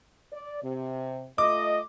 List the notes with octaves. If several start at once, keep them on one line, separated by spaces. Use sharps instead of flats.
D5
C3
A3 F4 D#5 D6